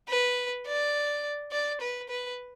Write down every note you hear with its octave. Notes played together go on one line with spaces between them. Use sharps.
B4
D5
D5
B4
B4